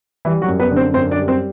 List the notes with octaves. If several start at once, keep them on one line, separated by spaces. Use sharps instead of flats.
E3 G3 E4
F#3 F#4
F#2
B3 B4
D3
C4 C5
F#2 C4 C5
D4 D5
G3
C4 C5